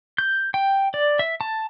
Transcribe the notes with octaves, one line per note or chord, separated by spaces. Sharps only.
G6
G5
D5
E5
A5